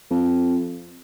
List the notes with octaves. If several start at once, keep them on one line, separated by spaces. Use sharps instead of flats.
F2